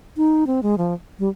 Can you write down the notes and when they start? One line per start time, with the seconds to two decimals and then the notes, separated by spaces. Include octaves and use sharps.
0.17 D#4
0.47 C4
0.63 G#3
0.78 F3
1.19 G3